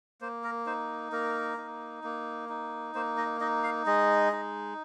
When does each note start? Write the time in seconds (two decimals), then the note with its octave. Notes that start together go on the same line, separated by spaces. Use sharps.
0.21 A#3 C5
0.44 A#4
0.66 D#4 C5
1.12 A#3 A#4
1.57 D#4
2.04 A#3
2.49 D#4
2.95 A#3 C5
3.17 D#5
3.41 D#4 D#5
3.64 F5
3.86 G#3 D#5
4.32 D#4